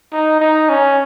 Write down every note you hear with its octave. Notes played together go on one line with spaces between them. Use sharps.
D#4
D#4
C#4